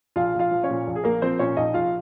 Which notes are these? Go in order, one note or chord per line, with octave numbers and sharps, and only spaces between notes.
A#1 F4 F5
A#1
F4 F5
F3
C#4 C#5
A#2
A#1
G#4
A#1 A#3 A#4
F3 C4 C5
A#2 C#4 C#5
A#1 D#4 D#5
A#1 F4 F5